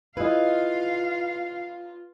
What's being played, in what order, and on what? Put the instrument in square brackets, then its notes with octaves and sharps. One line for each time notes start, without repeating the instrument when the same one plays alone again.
[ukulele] E4 G#4 D#5 [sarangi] F4 [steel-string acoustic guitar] B4 [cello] F5